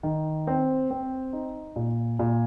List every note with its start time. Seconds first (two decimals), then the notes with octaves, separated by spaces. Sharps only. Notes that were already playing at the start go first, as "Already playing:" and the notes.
0.03 D#3
0.47 C4
0.90 C4
1.33 D#4
1.76 A#2
2.19 A#2